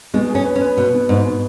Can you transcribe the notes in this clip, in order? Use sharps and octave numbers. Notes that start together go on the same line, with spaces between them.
B2 G#3
G#4
C#4
B4
C#4
B4
B2 B4
B2
G#2 B2
B2